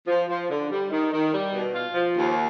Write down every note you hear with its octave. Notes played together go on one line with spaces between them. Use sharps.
F3
F3
D3
G3
D#3
D#3
G3
B2
F4
F3
D#2